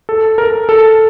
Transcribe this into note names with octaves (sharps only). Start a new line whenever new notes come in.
A4
A#4
A4